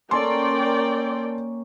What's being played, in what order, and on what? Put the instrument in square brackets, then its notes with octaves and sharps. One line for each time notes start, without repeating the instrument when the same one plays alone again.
[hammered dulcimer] A#3 C#4 [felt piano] A4 C6 [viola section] A#4 D5 G5